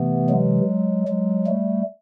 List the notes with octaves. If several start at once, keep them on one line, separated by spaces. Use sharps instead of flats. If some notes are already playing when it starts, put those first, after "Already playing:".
Already playing: C3 E3 A3 B3
F#3 G#3
F#3 G#3
G3 A3